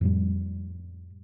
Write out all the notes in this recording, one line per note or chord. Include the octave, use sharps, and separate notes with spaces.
F2 A2 G3